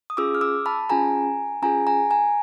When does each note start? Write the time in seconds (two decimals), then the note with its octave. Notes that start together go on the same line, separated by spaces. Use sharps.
0.10 D#6
0.17 C#4 F4 G#4 D6 E6
0.35 F6
0.41 D6 E6
0.66 A5 B5
0.90 C#4 F4 G#4 G#5 A#5
1.62 C#4 F4 G#4 G#5 A#5
1.87 G#5 A#5
2.11 G#5 A#5